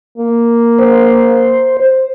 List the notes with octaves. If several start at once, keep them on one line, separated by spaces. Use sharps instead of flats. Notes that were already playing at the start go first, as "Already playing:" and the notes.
A#3
C5
C5